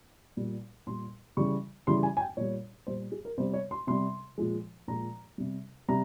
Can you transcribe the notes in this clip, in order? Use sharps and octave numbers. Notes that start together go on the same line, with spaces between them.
A#2 G3
A#2 G3 C6
C#3 E3 G3 C#6
C#3 E3 G3 C6
G#5
G#5
G5
A#2 G3 C#5
A#2 G3 C5
G#4
A#4
C3 G3 C5
C#5
C6
C3 G3 C6
A#2 F3 G#3
A#2 F3 G#3 A#5
C3 G3
C3 G3 A#5